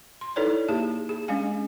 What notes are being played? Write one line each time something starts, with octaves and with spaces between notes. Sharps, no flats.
C6
D#4 E4 A4 B4 C#5 D5
A#3 G4 G#4 A5
G#4
G#3 C#4 D4 F5 G#5